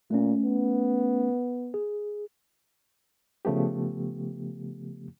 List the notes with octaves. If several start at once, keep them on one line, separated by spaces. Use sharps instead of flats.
A#2 A3 C#4
B3
G#4
C#3 F3 A3 B3 G4